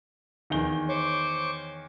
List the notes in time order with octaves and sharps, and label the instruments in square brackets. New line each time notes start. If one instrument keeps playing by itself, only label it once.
[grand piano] E2 D#3 G7 [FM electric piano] E3
[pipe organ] C5 C#6 D6 [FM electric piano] C#5